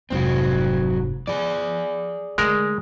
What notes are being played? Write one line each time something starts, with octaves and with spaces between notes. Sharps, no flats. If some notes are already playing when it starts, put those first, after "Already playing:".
F1 G#2 F#3 C4
F3 G#4 D5
D3 G#3 A3 A#4